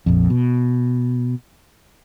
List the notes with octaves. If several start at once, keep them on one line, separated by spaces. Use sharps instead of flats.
A#1 F2
B2